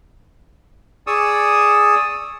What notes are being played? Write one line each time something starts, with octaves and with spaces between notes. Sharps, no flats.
G#4 D5 C#6 D#6 E6